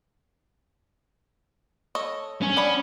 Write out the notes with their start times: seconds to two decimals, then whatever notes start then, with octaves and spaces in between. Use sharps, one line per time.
1.95 A4 C#5 D#5
2.42 C#4
2.57 B3 D4 B5